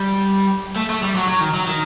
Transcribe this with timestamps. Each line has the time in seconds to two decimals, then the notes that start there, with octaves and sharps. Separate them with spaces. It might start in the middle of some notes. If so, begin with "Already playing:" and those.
Already playing: G3
0.76 A3
0.90 A3
1.03 G3
1.16 F#3
1.28 F#3
1.40 D#3
1.54 F#3
1.67 D#3